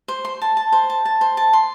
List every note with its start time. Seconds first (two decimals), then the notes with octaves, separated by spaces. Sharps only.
0.08 C5
0.25 C6
0.41 A5
0.57 A5
0.72 C5
0.90 A5
1.05 A5
1.21 C5
1.37 A5
1.53 C6